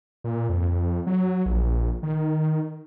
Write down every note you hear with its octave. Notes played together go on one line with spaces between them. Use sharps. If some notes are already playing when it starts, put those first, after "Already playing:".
A#2
F2
F#3
A#1
D#3